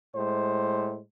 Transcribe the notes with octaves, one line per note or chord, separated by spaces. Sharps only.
A2 G#3 C5